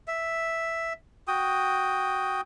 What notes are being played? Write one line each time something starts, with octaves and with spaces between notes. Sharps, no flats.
E5
F#4 G5 D#6